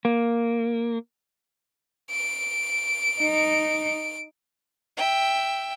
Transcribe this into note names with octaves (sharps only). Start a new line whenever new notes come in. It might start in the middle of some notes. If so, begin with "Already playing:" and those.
A#3
D7
D#4
E5 G5